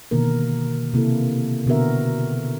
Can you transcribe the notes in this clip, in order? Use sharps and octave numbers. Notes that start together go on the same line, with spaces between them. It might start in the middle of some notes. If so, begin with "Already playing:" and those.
B2 D3 D#3 A#3 A#4
C3 A#3 E4 A4
B2 D3 B3 F#4 A#4 E5